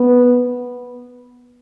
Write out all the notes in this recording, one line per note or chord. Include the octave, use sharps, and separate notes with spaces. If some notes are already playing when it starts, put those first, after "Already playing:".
Already playing: B3